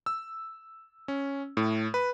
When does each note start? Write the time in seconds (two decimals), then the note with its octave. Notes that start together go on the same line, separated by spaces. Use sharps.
0.06 E6
1.08 C#4
1.57 A2
1.94 B4